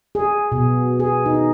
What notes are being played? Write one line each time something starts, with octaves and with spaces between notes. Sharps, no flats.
G#4
B2
G#4
D#4